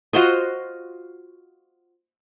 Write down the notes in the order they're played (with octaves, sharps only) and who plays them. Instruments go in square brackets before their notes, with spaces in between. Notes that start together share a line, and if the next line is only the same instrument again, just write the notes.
[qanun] F4 F#4 C5 D#5